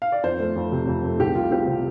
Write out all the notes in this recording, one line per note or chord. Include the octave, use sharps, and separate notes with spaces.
F5
D5
F2 C5
A3
F2
C3
F2
A3
C2 G4
G3 F4
C4 G4
C3